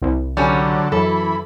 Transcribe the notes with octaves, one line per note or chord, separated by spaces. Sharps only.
C2
D3 F#3 G3 C#4 A4
F#2 E3 A4 B5